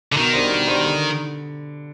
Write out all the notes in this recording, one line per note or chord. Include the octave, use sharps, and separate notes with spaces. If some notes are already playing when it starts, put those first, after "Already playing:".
D3
B2 D#3
G3 D4 G4 C5
B2
G3 D4 G4 C5
D3